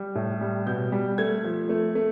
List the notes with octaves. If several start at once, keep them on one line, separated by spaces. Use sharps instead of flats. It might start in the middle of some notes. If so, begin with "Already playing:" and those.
Already playing: G3
A2
G3
B2 G6
G3
A3 G#6
F3
A3
A3